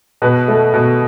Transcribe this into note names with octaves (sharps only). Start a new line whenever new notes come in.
B2 B4
A3
B2